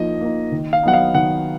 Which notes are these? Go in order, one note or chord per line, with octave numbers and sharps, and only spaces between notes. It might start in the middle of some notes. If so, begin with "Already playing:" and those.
Already playing: F3 A#3 D#4 D#5
A#3 D#4
D#3
F5
F#3 B3 D#4 F#5
F5
D#3 F#5